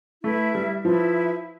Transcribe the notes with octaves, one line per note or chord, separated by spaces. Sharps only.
A3 E4 B4 E5
G3
F3 E4 B4 E5